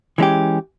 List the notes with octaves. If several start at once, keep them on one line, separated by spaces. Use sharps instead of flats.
E3 G#3 C#4 G4